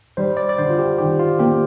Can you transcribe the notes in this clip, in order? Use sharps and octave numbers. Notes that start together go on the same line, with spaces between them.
G3 C5
D5
D5
D3 C5
F4
G4
D#3 G4
F4
A#3 G4